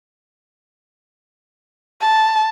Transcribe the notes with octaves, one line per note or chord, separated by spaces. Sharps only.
A5